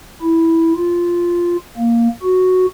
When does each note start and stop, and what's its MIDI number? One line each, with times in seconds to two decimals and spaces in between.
0.22 0.73 64
0.76 1.57 65
1.77 2.08 58
2.23 2.66 66